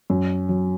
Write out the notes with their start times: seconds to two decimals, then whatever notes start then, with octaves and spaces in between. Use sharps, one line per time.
0.10 F#2
0.49 F#3